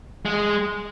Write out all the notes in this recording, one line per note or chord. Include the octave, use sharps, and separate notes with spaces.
G#3